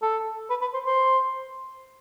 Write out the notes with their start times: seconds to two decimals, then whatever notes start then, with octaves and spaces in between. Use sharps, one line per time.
0.03 A4
0.50 B4
0.61 B4
0.74 C5
0.86 C5